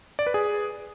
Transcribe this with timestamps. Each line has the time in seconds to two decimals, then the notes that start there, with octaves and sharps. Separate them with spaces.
0.19 D5
0.27 B4
0.34 G#4